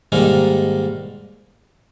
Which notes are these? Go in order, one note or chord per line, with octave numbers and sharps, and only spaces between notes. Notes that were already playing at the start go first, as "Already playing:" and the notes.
G#2 D#3 G3 A#3